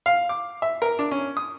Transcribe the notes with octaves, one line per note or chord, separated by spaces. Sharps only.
F5
D6
E5
A#4
D4
C#4
D#6